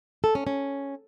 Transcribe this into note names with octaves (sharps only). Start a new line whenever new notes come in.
A4
C#4
C#4